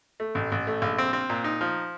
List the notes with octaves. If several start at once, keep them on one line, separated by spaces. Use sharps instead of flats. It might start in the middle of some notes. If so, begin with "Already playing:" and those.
A3
A1
A1
A3
A#1
C4
C4
A#2
D#4
F3